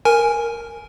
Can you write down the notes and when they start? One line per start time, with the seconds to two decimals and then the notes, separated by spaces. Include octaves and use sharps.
0.05 A#4 G#5